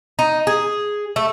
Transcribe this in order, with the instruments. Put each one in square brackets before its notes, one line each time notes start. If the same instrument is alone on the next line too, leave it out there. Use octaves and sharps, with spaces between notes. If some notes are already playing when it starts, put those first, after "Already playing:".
[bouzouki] D#4
G#4
A3